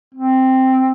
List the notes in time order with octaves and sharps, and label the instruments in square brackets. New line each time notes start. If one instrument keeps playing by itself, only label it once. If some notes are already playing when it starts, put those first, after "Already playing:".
[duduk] C4